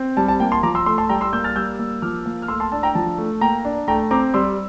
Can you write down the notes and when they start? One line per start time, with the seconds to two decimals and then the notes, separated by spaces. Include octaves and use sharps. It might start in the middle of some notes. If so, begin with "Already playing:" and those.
Already playing: C4
0.17 G3 A5
0.28 A5
0.40 A#3 G5
0.52 A5 C6
0.63 F3 A#5 D6
0.75 C6 E6
0.86 A3 C6 E6
0.98 A5 C6
1.09 G3 G5 A#5
1.21 C6 E6
1.33 A#3 E6 G6
1.44 F6 A6
1.56 G3 E6 G6
1.79 A#3
2.02 F3 D6 F6
2.26 A#3
2.42 F6
2.48 A3 C6 E6
2.60 A5 C6
2.72 D4 A5
2.83 G5 A#5
2.95 F3 A5
3.18 A3
3.41 A#3 G5 A#5
3.65 D4
3.88 A3 G5 A#5
4.11 C4 A#5 D6
4.34 G3 C6 E6